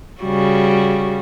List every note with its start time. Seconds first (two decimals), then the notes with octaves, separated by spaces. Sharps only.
0.21 C#3 G3 F#4